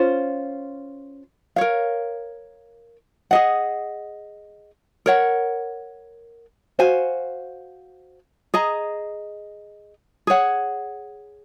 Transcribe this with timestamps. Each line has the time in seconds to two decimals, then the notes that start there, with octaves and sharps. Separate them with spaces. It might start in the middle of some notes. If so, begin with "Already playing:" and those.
Already playing: C#4 F4 C5
1.56 A#4 C#5 F5
3.31 G#4 D#5 F#5
5.06 A#4 C#5 F#5
6.79 F#4 C5 F5 G#5
8.54 G#4 D#5 A#5
10.27 G#4 C#5 F#5